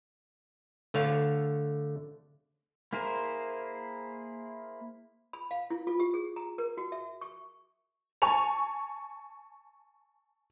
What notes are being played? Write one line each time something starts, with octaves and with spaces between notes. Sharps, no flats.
D3 A3 C#5 F5
A#3 E4 G#4 A#4 C5
B5
F5
E4
F4
G4
G#4
A#5
A#4
F#4
E5
C#6
G#5 A5 C#6 F7